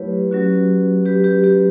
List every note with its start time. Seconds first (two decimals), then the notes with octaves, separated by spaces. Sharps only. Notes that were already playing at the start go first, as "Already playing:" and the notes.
Already playing: F#3 A3 E4 G4 B4 C#5
0.31 F#3 C#4 F#4
1.06 G4 B4
1.24 G4
1.44 G4